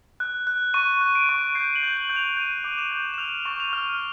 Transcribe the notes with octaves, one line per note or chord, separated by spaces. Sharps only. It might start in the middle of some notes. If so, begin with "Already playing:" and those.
F#6
F#6
C#6 D#7
F#6
D7
C#6
G6 C7
F#7
G6
F#7
G6
F7
G6 D#7
D6
E7
G6
E7
F6 F7
C#6
F7
F6